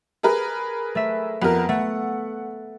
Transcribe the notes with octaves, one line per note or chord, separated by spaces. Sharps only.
G#4 A#4 B4
A3 E5
F2 B3 A#4
A3 F#5